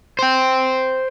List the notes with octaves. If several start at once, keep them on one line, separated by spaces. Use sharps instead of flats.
C5 G5